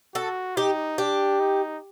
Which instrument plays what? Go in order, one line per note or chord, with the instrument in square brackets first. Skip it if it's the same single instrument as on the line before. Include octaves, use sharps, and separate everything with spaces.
[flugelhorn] F#4 [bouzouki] A4
[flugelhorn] D#4 [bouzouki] G4
[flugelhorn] D4 [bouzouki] G4
[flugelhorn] D#4